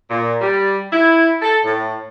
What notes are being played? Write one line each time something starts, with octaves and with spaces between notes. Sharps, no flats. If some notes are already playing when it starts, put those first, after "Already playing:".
A#2
G3
E4
A4
A2